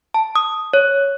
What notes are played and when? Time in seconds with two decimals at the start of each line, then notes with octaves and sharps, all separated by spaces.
0.14 A5
0.36 D#6
0.73 C#5